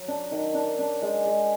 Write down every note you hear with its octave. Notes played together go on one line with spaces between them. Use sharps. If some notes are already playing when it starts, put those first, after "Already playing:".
Already playing: F#3
D4
D#3
D4
D4
G#3
G#3